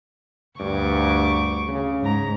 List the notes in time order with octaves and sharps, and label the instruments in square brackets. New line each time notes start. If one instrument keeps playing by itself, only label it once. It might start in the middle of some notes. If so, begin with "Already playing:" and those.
[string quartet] D2 C#6 D6 [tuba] G2
[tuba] C#3
[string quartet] G#2 A#5